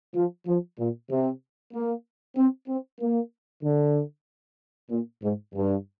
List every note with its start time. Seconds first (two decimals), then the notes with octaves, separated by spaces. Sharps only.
0.14 F3
0.47 F3
0.79 A#2
1.10 C3
1.74 A#3
2.37 C4
2.68 C4
3.00 A#3
3.63 D3
4.90 A#2
5.23 G#2
5.55 G2